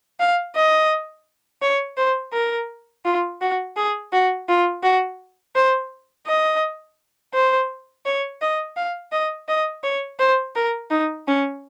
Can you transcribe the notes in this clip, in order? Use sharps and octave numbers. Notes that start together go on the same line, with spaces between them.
F5
D#5
C#5
C5
A#4
F4
F#4
G#4
F#4
F4
F#4
C5
D#5
C5
C#5
D#5
F5
D#5
D#5
C#5
C5
A#4
D#4
C#4